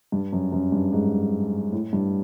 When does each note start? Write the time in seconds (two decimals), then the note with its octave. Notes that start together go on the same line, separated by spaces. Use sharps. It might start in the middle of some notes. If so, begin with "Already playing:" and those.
0.12 G2
0.33 F#2
0.52 F#2
0.72 G2
0.93 G#2
1.72 A2
1.93 G2